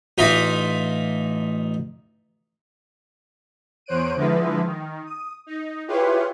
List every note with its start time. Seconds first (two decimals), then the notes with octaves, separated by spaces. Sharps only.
0.18 A1 D#4 F4 E5
3.86 E2 C5 C#5 F#6 D7 D#7
4.16 D3 F3 G#3 E4 B4
4.65 D#3
5.06 D#6
5.46 D#4
5.88 E4 F4 G4 G#4 B4 C#5